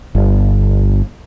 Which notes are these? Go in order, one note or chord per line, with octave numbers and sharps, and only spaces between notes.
G1